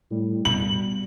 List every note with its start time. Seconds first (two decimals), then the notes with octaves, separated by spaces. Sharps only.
0.11 A2 G3
0.45 B2 F#7